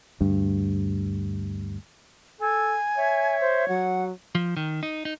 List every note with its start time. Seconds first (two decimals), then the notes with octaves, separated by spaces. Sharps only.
0.20 D2 G2
2.41 A4 G#5
2.97 C#5 E5
3.41 C5
3.68 F#3 F#5
4.35 F3
4.57 D#3
4.83 D#4
5.05 D#4